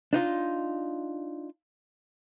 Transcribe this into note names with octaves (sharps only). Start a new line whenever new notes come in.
D4 D#4 F4